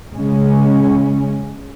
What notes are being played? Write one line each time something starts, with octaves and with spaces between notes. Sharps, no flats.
C#3 G#3 C#4